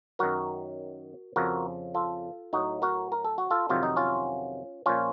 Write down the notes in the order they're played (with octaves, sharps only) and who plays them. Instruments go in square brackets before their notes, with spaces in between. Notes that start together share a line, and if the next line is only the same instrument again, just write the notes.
[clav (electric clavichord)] F#2 D#3 F#3 F#4 A#4
F2 C#3 F3 F#4 A#4
F4 A4
A2 F#3 D#4 F#4
F#4 A#4
A#4
A4
F#4
F4 A4
F2 C3 D#3 F#3 F4
D#4
C#4 F4
A#2 F3 C#4 F4